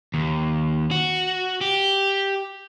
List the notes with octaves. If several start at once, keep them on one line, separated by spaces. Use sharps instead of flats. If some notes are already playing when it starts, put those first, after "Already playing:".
D#2
F#4
G4